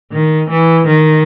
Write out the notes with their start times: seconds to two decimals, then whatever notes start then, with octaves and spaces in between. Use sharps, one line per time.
0.13 D#3
0.50 E3
0.87 D#3